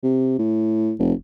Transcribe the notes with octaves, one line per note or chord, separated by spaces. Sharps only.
C3
A2
F1